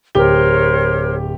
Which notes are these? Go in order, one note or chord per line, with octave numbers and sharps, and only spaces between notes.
D1 G4 A#4 C5 C#5 G7